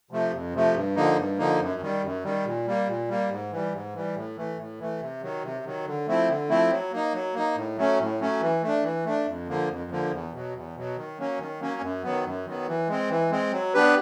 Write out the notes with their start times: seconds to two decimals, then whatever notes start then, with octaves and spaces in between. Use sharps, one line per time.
0.11 C3 F3 A3
0.32 F2
0.54 C3 F3 A3
0.75 G2
0.96 D3 F3 A#3 D#4
1.17 G2
1.38 D3 F3 A#3 D#4
1.60 F#2
1.81 D#3 G3
2.02 F#2
2.24 D#3 G3
2.45 A#2
2.67 G3 A#3
2.88 A#2
3.09 G3 A#3
3.30 G#2
3.52 E3 G3
3.73 G#2
3.94 E3 G3
4.15 A2
4.36 E3 A3
4.58 A2
4.79 E3 A3
5.00 C3
5.22 D#3 F#3
5.43 C3
5.64 D#3 F#3
5.85 D3
6.07 F3 A3 C4 E4
6.29 D3
6.49 F3 A3 C4 E4
6.71 F#3
6.92 A#3 D#4
7.13 F#3
7.35 A#3 D#4
7.56 A2
7.77 F#3 A3 C#4
7.99 A2
8.20 F#3 A3 C#4
8.41 E3
8.62 A3 D4
8.83 E3
9.05 A3 D4
9.26 F2
9.47 D3 F3 A#3
9.69 F2
9.91 D3 F3 A#3
10.11 E2
10.33 B2 F#3
10.54 E2
10.75 B2 F#3
10.97 D#3
11.18 F#3 A#3 C#4
11.39 D#3
11.60 F#3 A#3 C#4
11.81 F#2
12.03 D#3 F#3 B3
12.24 F#2
12.45 D#3 F#3 B3
12.67 E3
12.88 G#3 C4
13.09 E3
13.31 G#3 C4
13.52 F#3
13.74 B3 D4 G4 B4